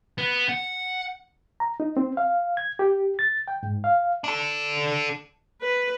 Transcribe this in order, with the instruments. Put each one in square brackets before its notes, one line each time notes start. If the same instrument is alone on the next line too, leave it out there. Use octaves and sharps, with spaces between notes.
[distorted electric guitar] B3
F#5
[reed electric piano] A#5
D#4
C4
F5
G#6
G4
A6
G5
G#2
F5
[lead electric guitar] D4 A4
[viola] B4